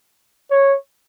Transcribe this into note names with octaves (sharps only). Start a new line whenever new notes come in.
C#5